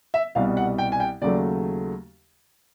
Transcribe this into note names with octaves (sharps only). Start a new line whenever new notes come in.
E5
C2 B2 G3 F5
F#5
G5
G#5
G5
D#2 C#3 F#3 A3 D5